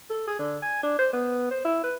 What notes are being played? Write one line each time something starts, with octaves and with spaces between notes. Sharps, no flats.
A4
G#4
D3
G#5
D4
C5
B3
C5
E4
B4